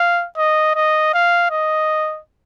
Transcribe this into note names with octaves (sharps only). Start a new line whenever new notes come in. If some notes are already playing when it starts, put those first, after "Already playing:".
Already playing: F5
D#5
D#5
F5
D#5